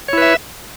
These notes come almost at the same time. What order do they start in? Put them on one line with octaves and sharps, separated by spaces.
C#5 E4 B4 E5